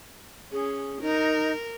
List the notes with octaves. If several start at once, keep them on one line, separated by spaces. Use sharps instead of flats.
C#4 G#4
D#4 A#4